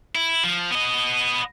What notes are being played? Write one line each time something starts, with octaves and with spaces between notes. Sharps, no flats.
E4
F3
B3 D#5